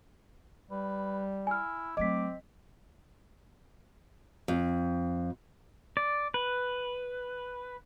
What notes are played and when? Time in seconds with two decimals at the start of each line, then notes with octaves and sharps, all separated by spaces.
0.71 G3 B4
1.47 E4 G#5 F6
1.97 F#3 A3 C4 D#5 D6 B6
4.48 F2
5.97 D5
6.34 B4